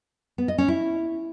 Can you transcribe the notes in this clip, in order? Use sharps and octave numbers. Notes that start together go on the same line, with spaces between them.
B3
D#5
C#4
E4